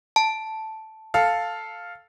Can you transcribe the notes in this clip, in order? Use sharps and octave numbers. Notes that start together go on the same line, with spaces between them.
A5
A4 F5